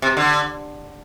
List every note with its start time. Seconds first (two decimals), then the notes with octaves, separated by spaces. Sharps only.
0.02 C3
0.17 D3